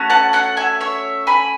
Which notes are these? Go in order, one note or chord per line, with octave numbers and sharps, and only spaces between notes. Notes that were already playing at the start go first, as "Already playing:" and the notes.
Already playing: A3 C#4 F#4
F#5 A5
F#5 A5
E5 G#5
C#5 E5
G#5 B5